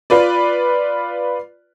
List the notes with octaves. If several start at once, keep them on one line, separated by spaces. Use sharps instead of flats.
F4 B4 D5